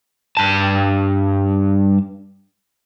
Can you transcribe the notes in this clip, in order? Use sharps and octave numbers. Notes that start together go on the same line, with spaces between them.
G2 A5